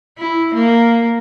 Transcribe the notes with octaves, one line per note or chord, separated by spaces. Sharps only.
E4
A#3